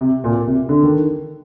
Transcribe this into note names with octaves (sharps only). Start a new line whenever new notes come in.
C3
A#2
C3
D3
D#3